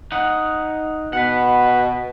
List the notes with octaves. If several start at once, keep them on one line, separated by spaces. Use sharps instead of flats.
D#4 F#5
B2 B4 F#5